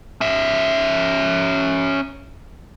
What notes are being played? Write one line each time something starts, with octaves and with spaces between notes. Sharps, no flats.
C#4 E5